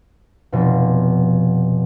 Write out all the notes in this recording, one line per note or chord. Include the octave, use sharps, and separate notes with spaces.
F1 B2